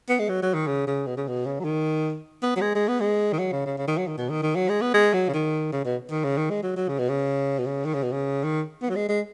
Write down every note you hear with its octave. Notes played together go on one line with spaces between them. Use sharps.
B3
G#3
F#3
F#3
D#3
C#3
C#3
B2
C#3
B2
C#3
F#3
D#3
B3
F#3
G#3
G#3
B3
G#3
D#3
F#3
C#3
C#3
C#3
D#3
F#3
D#3
B2
D#3
D#3
F#3
G#3
B3
G#3
F#3
C#3
D#3
C#3
B2
D#3
C#3
D#3
G#3
F#3
F#3
C#3
B2
C#3
B2
C#3
D#3
C#3
B2
C#3
D#3
B3
F#3
G#3
G#3